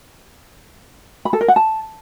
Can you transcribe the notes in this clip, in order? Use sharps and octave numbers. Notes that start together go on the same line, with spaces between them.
B5
A4
A#4
F#5
A5